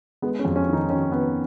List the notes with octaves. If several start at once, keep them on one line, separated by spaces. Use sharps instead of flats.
G#3 B3
C#4
F2
C#4
D#3
D#4
D#3 C#4
B3